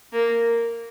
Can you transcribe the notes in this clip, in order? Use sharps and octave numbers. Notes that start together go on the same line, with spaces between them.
A#3